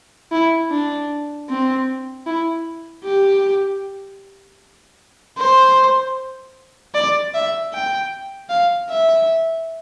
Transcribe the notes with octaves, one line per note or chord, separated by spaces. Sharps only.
E4
D4
C4
E4
G4
C5
D5
E5
G5
F5
E5